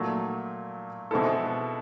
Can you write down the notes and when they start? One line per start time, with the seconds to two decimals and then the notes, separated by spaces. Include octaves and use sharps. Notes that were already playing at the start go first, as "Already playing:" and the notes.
Already playing: A#2 F#3 A3
1.11 B2 G#3 C4 E4 A4